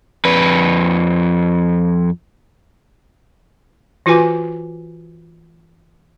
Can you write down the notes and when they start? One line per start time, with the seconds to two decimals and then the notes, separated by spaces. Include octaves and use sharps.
0.25 F2 B4
4.06 E3 F4 F#4 B4 G#5 D6